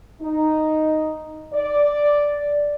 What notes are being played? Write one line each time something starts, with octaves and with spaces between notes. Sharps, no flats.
D#4
D5